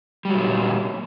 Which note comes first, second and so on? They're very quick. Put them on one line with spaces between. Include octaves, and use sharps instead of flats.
G3 F#3 A#2